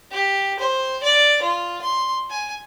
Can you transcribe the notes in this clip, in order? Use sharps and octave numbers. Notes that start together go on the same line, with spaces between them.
G4
C5
D5
F4
C6
G#5